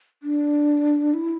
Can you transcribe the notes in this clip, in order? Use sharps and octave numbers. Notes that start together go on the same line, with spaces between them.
D4
E4